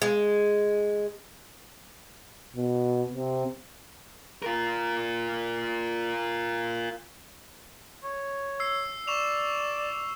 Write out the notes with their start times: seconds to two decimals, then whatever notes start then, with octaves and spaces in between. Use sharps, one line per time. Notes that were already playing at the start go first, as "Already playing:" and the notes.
0.02 G#3
2.56 B2
3.13 C3
4.43 F4 A#4
8.04 C#5
8.60 E6 C7
9.07 D5 C#6 E7 F7